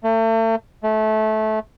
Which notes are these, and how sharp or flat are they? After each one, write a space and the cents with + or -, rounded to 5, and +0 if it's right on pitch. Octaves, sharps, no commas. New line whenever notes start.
A3 +40
A3 -20